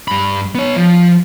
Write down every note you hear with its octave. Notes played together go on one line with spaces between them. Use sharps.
G2 B5
B3 C#5
F3